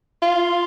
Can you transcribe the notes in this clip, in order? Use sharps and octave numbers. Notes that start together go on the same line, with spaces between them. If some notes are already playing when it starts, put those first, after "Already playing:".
F4